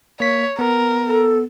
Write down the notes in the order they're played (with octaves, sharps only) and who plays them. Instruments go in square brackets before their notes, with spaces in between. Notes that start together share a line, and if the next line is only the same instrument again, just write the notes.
[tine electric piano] A#3 B6 [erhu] C#5
[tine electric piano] B3 [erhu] A#4
[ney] A4